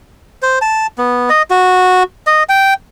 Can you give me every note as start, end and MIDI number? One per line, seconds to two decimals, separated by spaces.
0.42 0.59 72
0.62 0.87 81
0.98 1.30 59
1.30 1.42 75
1.50 2.03 66
2.27 2.43 75
2.49 2.74 79